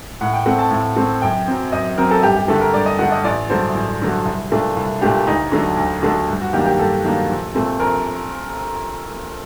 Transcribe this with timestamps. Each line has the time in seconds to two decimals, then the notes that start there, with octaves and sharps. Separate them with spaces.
0.21 A2 F#5
0.33 G5
0.46 A3 C4 F#5
0.59 A5
0.71 A2
0.97 A3 C4
1.22 F#2 G5
1.47 F#3 C4
1.72 F#2 D#5
1.98 F#3 C4 A#4
2.11 A4
2.23 G2 G4
2.36 G4
2.48 D3 A3 A4
2.61 A#4
2.74 G2 D5
2.86 D#5
2.99 D3 A3 F#5
3.12 D#5
3.24 A1 D5
3.49 G2 D3 F#3 A3 C5
3.75 A1
4.00 G2 D3 F#3 A3
4.25 C2
4.51 A#2 A3 D4
4.77 C2
5.01 A#2 A3 D4 G4
5.27 D2 D#4
5.52 D3 F#3 A3 D4
5.77 D2
6.03 D3 F#3 A3 D4
6.29 G2
6.41 F#4
6.53 D#3 F#3 A#3 D4 G4
6.66 G4
6.79 G2 A4
7.05 D#3 F#3 A#3 D4
7.30 A#1
7.54 A#2 A3 C4
7.80 A#1 A#4